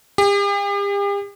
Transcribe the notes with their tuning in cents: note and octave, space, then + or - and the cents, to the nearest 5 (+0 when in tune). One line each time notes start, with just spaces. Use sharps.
G4 +45